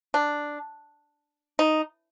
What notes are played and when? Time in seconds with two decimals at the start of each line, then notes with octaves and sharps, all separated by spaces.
0.14 D4
1.59 D#4